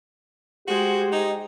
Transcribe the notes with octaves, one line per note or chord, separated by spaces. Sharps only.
G#3 F#4 G4 C5
D#4 D#5